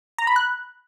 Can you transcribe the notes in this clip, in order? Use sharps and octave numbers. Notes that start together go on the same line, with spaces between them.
A#5
B5
F#6